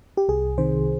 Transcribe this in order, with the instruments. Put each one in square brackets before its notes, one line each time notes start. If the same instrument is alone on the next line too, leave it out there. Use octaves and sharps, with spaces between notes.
[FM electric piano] G4
C2 G#4
C3 D#3 C5